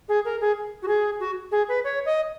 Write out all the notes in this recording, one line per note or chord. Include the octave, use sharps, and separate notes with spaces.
G#4
A#4
G#4
F#4
G#4
F#4
G#4
B4
C#5
D#5